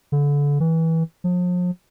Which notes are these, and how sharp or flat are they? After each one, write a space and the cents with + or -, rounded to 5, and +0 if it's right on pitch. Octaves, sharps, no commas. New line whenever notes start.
D3 -30
E3 -20
F3 +40